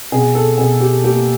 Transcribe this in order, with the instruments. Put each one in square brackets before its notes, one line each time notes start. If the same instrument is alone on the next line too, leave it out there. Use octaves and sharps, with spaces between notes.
[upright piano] B2 G#4
A4
B2 G#4
G4
A#3 G4